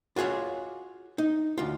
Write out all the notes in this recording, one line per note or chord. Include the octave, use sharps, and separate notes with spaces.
F4 F#4 G#4 C#5 F5
D#4
D2 F4